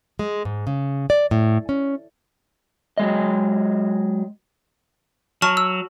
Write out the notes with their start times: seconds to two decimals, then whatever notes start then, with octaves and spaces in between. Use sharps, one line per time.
0.19 G#3
0.45 G#2
0.67 C#3
1.10 D5
1.31 A2
1.69 C#4
2.98 F#3 G#3 D#5
5.42 F#3 A5 C#6 F6
5.57 E6